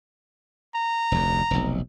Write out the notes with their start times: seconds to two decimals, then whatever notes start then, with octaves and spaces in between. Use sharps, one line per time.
0.75 A#5
1.12 F1 D2
1.51 F1 B1